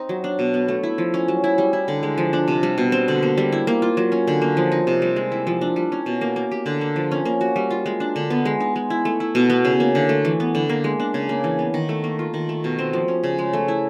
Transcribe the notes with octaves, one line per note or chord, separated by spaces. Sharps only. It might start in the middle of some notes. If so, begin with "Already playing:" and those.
Already playing: C4 D#4
F#3
D4
B2
B3
A3
E4
F3
C#4
F#3
E4
G3
E4
D3
G#3
F3
D4
C3
G3
B2
C4
D3
A#3
G3
E4
A#3
F4
F#3
C#4
D3
A#3
F3
D#4
C3
G3
G#3
E4
F3
D4
G3
C#4
B2
A#3
A#3
G4
D3
A#3
F3
C#4
A#3
F#4
G3
F4
G#3
D4
D3
B3
G#3
D#4
G#3
E4
A3
E4
B2
B3
C#3
A#3
D3
A3
E3
B3
D3
A#3
G#3
D4
C#3
A#3
E3
B3
D#3
A3
A#3
F4
D#3
A3
B2
C4
F3
C#4
C#3
G#3
A3
E4